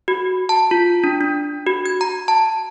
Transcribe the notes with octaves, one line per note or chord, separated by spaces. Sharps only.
F#4
A5
F4
D4
D4
F#4
G#6
A#5
A5